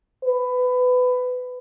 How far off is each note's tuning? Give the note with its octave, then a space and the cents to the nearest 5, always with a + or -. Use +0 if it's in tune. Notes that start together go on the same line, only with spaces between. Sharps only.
B4 +20